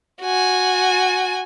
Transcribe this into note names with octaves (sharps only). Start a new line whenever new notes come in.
F#4 G#5